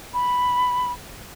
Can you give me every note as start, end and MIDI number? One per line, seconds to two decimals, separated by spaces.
0.14 0.92 83